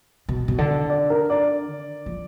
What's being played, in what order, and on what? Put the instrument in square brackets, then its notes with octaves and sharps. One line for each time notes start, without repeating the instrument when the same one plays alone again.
[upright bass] B2
B2
D3
[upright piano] D5
A#4
D5
[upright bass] F3